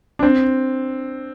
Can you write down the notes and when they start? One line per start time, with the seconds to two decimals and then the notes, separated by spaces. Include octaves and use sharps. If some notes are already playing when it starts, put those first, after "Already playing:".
0.19 D4
0.23 C4